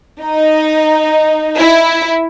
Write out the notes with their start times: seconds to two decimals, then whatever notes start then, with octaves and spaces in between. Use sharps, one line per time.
0.22 D#4
1.58 E4